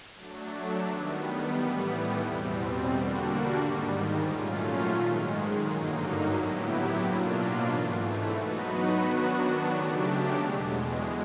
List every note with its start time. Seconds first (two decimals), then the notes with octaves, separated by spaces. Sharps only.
0.16 F#3 A3 D4
0.84 D#3 G3 B3
1.52 A2 E3 G3 B3
2.20 E2 B2 G3 C4
2.87 D3 G3 A#3 D4 F#4
3.56 G#2 D#3 G3
4.23 A#2 F#3 A3 C#4 F4
4.91 G#2 D#3 G#3
5.60 G2 D3 F#3 A#3 D#4
6.28 A2 F#3 B3 E4 G4
6.96 B2 F#3 A#3 D4 F4
7.63 G#2 E3 A3
8.31 F#3 B3 D#4 F#4 B4
8.99 D#3 F#3 B3 D4 F#4
9.67 C#3 F#3 A3 D4 G4
10.35 E2 B2 G#3